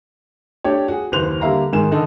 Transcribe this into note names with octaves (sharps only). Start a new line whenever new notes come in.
A3 D4 G4 C#5
F#4 G#4
F#1 D#2 B4 C5 F#6 F7
D3 G3 A#3 E5 F5 A#5
G#2 D#3 G#4 A#4 E7
D3 D#3 D#4 A4